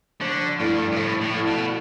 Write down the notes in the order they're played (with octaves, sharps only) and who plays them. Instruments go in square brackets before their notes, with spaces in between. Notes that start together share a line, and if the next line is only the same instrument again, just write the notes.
[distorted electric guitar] D3 [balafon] F3
[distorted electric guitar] G2 [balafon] A3 E4 A4 D5
[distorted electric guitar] G2
[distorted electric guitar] A2 [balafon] F3
[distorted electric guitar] A2
[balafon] A3 E4 A4 D5
[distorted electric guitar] B2